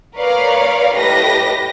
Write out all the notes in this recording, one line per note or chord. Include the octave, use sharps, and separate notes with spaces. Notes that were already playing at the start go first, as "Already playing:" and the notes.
A#4 B4 C#5 D5 F5
A2 G4 B4 D#5 A#6